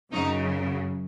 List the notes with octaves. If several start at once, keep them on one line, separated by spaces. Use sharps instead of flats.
F#2 C#3 F#3 D#4